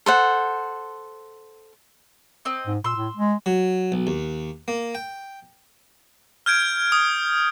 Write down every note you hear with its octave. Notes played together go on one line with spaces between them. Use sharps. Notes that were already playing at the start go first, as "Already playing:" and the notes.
A4 C5 F#5
C4 D#5
G#2
A#2 C6 E6
A2
G#3
F#3
B1
D#2
A#3
G5
F6 G6 G#6 D7
D#6